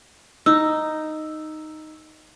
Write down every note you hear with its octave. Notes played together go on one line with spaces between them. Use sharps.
D#4 E6